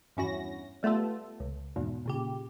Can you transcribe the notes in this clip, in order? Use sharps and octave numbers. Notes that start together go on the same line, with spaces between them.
E2 G2 C#4 E4 F#4 A#6
G3 A3 B3 F4 A4
C#2
E2 G#2 B2
A#2 C#3 G4